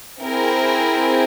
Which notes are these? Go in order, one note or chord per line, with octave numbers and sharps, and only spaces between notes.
C4 E4 G#4 A#4